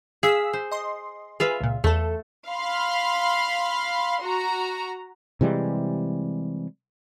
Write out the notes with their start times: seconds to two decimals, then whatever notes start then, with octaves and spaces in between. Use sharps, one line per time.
0.23 G#4 F5 E6 B6
0.53 C5
0.71 D#5 C6
1.40 F4 G#4 B4 E5 F5
1.60 C#2 A#2
1.84 E2 A3 A4
2.48 F5 B5 C6
4.22 F#4 A#5
5.41 C3 E3 G3 G#3